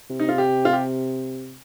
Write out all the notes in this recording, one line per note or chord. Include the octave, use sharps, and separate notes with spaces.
C3
D#4
F4
G4
F4
G4